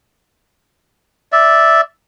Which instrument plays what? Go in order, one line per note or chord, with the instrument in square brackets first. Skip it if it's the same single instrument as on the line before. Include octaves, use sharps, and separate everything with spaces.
[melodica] D5 E5